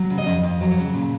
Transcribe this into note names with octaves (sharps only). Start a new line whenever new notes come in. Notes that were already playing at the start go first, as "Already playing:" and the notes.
Already playing: F#3
C#3
D#5
F2
F2
F#3
C#3
A#2